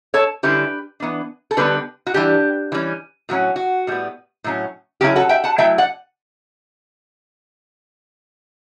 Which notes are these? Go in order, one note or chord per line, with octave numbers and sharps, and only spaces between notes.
A4 C#5
D3 G3 C#4 E4 G4 B4
E3 B3 D4
A4
D3 G3 B3 D4 G4 B4
F#4
E3 G3 D4 G4
E3 G3 C#4
A2 F#3 C#4 F#4
F#4
A2 G3 B3
A2 F#3 C#4
C#3 F#3 C#4 E4 G4
F#4 A4
E5 G5
F#5 A5
F#3 A3 E4 E5 G5
D5 F#5